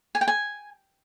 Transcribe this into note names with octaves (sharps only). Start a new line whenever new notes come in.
G#5
G5
G#5